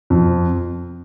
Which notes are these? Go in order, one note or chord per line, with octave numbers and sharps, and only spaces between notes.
F2